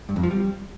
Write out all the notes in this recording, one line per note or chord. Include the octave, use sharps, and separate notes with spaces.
G2
F2
F3
G3